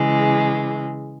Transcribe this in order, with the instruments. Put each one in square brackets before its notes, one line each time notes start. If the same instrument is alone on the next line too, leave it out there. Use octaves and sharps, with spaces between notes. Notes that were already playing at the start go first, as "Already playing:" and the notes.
Already playing: [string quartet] C#3 E3 G#3